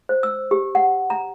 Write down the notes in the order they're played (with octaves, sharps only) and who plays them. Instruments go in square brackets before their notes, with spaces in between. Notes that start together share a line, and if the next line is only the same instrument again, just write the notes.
[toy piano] C5
E6
G4
F#5
A#5